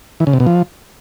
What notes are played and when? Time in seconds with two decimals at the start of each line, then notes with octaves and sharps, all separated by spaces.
0.20 E3
0.27 C#3
0.33 C3
0.40 B2
0.47 F3